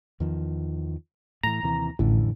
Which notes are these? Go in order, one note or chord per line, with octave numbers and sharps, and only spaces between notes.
E2 D#3 F3
A2 E3 A#5
D#2 C3 E3
A1 F2 D3 E3